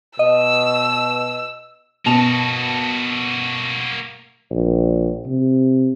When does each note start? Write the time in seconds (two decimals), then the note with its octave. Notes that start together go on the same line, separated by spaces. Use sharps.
0.19 B2 D#5 E6
2.06 B2 A#3 F#4 A5 F7
4.51 A#1
5.26 C3